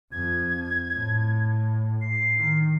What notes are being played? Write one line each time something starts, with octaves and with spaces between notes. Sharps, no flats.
F2 G#6
A2
C7
D#3